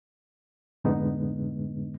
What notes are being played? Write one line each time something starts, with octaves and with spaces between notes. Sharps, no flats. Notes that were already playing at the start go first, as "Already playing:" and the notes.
F2 A2 D3 G#3 B3 D#4